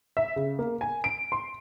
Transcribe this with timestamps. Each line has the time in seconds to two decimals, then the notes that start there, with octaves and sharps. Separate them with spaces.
0.17 E5
0.36 C#3
0.59 A#3
0.81 G#5
1.04 D7
1.32 C6